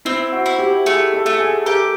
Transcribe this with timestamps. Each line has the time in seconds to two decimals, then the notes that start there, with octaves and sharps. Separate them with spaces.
0.05 C4 E4
0.32 F#4
0.46 E4
0.59 G4
0.86 A3 G#4
1.13 A4
1.26 A3
1.39 G#4
1.66 G4 A#4